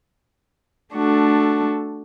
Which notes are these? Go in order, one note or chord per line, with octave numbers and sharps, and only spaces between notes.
A3 D4 F#4 A4